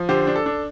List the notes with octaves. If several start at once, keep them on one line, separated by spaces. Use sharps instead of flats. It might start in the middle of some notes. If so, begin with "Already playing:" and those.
Already playing: F3
D3 G4 C5
D4
A4
D4